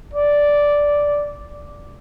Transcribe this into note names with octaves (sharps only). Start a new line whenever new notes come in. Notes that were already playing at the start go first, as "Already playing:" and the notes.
D5